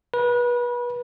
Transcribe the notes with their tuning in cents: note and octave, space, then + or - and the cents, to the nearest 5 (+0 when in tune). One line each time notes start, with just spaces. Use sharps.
B4 -30